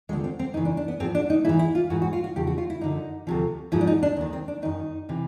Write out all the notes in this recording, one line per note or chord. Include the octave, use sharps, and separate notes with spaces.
D#2 D3 F3 G#3
C4
C4
F#2 C#3 E3 D#4
D4
D4
B3
G#2 F3 C4
D4
D#4
G#2 E3 E4
E4
F4
G#2 E3 F#4
F#4
F4
F#4
E2 C#3 F3 G4
F#4
F4
E4
F#2 D3 F3 D#4
D2 C3 F3
G#2 F3 E4
D4
D#4
D4
D#2 D#3
C4
D4
F#2 D#3 D#4
C3 E3